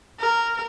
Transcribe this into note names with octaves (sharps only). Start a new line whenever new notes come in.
A#4